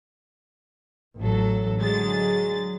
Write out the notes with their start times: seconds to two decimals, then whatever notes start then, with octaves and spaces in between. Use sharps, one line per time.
1.19 A1 F#3 A4
1.79 D3 F#3 G#3 A6